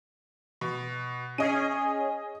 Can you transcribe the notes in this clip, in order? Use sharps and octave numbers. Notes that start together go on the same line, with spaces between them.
B2
C#4 G#4 D#5 D#7